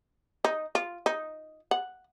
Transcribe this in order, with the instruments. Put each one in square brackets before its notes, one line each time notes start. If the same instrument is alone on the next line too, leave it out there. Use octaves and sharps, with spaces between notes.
[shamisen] D#4
F4
D#4
F#5